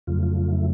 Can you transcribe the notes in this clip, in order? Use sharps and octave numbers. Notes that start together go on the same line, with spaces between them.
F2 C#3 F#3 A3 F4
F4
F4
E4